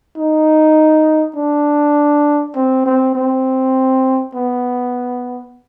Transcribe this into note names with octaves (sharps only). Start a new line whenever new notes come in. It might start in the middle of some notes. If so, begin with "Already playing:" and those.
D#4
D4
C4
C4
C4
B3